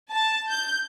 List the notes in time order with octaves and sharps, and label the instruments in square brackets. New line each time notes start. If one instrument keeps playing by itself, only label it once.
[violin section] A5
G6